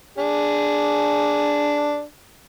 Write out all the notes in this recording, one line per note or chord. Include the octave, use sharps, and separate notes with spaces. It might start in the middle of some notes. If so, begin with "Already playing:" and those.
D4 G#4